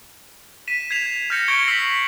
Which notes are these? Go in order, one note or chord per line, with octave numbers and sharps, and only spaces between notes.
B6 D#7 E7
G#6 B6 C7 E7 F7
F6 G6 A#6 C#7
C#6 G#6 D7 G7
E6 B6 C7 F#7